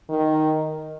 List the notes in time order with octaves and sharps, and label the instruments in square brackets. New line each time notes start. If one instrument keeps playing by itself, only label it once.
[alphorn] D#3